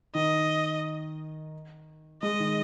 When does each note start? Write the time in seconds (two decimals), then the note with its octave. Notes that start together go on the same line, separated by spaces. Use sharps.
0.15 D#3 D#5
2.23 G#3 D#5
2.40 D#3